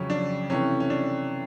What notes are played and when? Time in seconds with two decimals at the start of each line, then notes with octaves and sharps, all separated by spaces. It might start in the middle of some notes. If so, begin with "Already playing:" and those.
Already playing: F2 C#3 F#3 C#4
0.10 D4
0.50 C3 E3 A3 C#4
0.80 C#4
0.90 D4